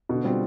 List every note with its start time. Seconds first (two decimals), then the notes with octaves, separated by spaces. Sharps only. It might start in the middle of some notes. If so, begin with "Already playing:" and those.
0.09 B2 D3
0.24 G3 C4 F4